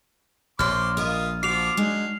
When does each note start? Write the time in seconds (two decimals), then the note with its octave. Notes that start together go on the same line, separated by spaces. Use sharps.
0.59 A#1 A#2 C5 C#5 C6 D6 F6
0.97 F4 A#4 D#5 E5 D#6
1.43 F3 F#4 D6 C7 F7
1.77 F#3 G#3 D4